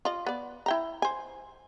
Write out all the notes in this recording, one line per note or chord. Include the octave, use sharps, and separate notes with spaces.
F4 D#5
B3 D5
E4 G5 A#5
C5 G#5